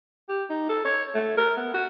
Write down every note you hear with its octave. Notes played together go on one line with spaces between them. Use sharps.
G4
D#4
A4
C#5
A3
A#4
B3
F#4